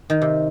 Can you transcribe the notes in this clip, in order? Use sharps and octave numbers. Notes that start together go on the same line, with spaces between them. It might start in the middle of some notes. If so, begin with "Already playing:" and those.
D#3
C3